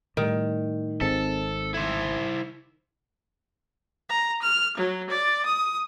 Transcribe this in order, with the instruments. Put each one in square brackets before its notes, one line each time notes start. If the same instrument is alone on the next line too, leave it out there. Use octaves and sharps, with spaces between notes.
[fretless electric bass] A2 G3 [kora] D#3
[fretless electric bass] G#1 G#3 C4 [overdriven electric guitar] A4
[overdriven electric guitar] E4 C5
[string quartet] A#5
F6
F#3
D5
D#6